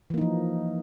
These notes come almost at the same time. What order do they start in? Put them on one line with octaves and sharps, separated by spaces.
E3 A#3 D#4 F3